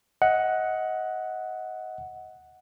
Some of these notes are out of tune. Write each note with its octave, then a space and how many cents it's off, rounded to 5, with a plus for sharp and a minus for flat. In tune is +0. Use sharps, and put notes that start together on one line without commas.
D#5 +25 F#5 +0